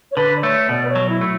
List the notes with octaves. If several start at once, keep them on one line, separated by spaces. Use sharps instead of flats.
C#5
D3 B4
D5
A3 C#5
B2 D5
B4
C#5
F#3
E4
A3